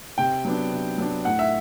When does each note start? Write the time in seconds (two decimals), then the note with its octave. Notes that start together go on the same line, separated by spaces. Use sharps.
0.18 C3 G5
0.45 F#3 B3 D4
0.72 C3
0.98 F#3 B3 D4
1.25 A2 F#5
1.39 E5